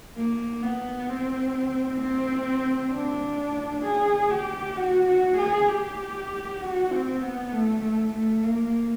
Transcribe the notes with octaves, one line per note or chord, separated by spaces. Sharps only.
A#3
B3
C4
C4
D4
G#4
G4
F#4
F#4
G#4
G4
F#4
C4
B3
A3
A3
A3
A#3